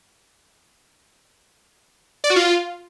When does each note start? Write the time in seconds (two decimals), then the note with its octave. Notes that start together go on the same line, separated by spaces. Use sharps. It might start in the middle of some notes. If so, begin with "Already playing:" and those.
2.24 D5
2.30 F#4
2.36 F4